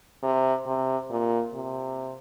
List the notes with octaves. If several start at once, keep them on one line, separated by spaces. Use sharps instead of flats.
C3
C3
A#2
C3